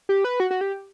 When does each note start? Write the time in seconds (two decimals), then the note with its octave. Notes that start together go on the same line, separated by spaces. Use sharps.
0.09 G4
0.24 B4
0.40 F#4
0.51 F#4
0.61 G4